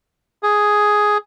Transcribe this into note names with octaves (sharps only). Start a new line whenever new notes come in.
G#4